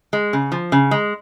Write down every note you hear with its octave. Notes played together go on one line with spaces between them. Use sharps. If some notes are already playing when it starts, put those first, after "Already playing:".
G#3
C#3
F3
C#3
G#3